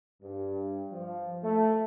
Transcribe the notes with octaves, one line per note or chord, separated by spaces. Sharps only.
G2
F3
A3